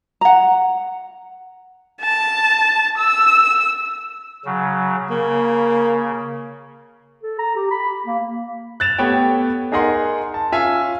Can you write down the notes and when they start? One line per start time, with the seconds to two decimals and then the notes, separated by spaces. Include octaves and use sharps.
0.21 F#5 A#5
2.01 A5
2.97 E6
4.45 C#3 F#3
5.10 C#3 A#3
7.23 A4
7.39 A#5
7.56 G4
7.71 B5
8.06 A#3
8.80 F#6 A6 E7 F7
8.99 A3 B3 G4 C#5 G5
9.72 D#4 G#4 A#4 D#5 F#5 C6
10.34 A5
10.52 C#4 F4 E5 F5 G#5